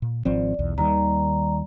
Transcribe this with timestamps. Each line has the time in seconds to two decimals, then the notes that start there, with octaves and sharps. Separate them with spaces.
0.02 A#2
0.25 G#1 F3 C4 D5
0.59 B1 E2
0.78 D#2 D#3 G3 D5 A#5